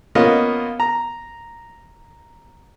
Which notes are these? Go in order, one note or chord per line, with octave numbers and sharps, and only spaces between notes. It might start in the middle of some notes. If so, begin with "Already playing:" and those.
A#3 B3 C#4 F4 A#4 D#5
A#5